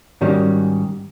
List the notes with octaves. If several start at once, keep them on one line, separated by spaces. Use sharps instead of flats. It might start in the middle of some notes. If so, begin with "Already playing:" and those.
G#2 D#3 G3 C#4 F#4